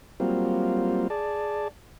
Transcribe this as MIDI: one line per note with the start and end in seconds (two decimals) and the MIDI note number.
0.20 1.08 54
0.20 1.08 55
0.20 1.08 58
0.20 1.08 60
0.20 1.08 65
1.10 1.68 68
1.10 1.68 74
1.10 1.68 81